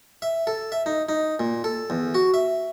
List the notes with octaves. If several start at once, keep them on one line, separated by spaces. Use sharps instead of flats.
E5
A4
E5
D#4
D#4
A#2
A4
E2
F#4
E5